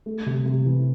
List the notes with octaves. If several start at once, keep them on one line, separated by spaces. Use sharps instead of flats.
A3
C3
C3
E3